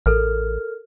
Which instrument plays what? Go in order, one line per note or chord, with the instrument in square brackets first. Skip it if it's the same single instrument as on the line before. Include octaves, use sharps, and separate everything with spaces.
[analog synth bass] A1 [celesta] A4 A#4 F6